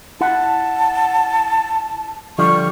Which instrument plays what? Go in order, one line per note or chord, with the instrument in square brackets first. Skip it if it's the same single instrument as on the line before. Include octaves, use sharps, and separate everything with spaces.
[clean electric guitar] E4 F#5 [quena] A5
[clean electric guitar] D3 F3 G3 [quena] C#6